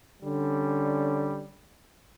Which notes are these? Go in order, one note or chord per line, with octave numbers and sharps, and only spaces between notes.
D3 G3 C#4